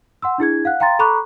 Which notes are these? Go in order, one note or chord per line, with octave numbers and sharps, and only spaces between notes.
F#5 C6 E6
D4 E4 G#4 G#6
F5 F#5 F#6
F5 G5 A#5 C6 A6
A4 A#5 B5 C#6 D6 F#6